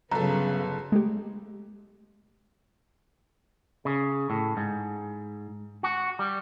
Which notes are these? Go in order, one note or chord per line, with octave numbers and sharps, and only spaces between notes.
G1 C#3 F#3 B3 A4 A#5
G#3 A3 G4
C#3
A2
G#2
F#4
G3